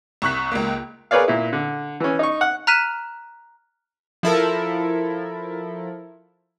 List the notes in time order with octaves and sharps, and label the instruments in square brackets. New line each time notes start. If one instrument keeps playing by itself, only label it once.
[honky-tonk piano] C2 C#6 F#6 B6
C#2 A#3
[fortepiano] G#4 A#4 B4 C#5 D5 F5
A#2 E4
D3
E3 C#4
D#4 C#6
F#5
[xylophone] A#5 F6 F#6 B6 D#7 E7
[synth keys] F3 E4 A4 A#4